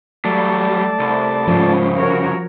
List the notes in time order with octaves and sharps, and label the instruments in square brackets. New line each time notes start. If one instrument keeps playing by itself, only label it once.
[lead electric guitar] F#3 G3 [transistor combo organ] A3 D5 A5
[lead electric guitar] C2
[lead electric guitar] C2 C#3 [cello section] G#2 [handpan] F3
[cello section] F#4 A#4 C#5